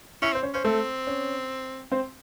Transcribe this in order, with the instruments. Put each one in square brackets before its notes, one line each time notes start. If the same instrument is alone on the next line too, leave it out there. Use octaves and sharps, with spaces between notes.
[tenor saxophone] C#4 [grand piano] E4 E5
[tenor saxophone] C4 [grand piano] C5
[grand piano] C#4 C#5
[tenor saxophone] C#4 [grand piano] C5
[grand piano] A3 A4 [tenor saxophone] C4
[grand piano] C#4 C#5
C4 C5